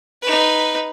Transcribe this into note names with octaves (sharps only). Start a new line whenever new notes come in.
D#4 B4